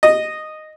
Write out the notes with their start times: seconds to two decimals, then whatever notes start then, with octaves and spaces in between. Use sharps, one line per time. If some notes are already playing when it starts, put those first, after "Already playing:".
0.03 D#5